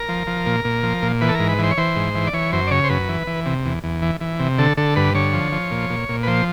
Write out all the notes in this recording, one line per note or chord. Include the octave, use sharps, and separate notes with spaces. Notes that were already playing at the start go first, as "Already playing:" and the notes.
Already playing: A#4
F3
F3
A#2
A#2
F3
A#2
E3 B4
A4
G#2 A#4
B4
E3 C5
C#5
E3 C5
G#2
E3
D5
E3 C#5
F#2 C5
D5
C#3 C#5
C5
F#2 B4
E3
E3
C3
E2
E2
E3
E3
C3
D3 A4
D3 A4
G2 B4
D3 C#5
F3
F3
A#2
A#2
A#2
B4
F3 C5